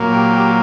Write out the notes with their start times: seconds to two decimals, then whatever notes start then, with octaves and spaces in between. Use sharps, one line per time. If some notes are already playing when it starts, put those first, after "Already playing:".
Already playing: A#2 F#3 A#3
0.13 G4
0.33 G4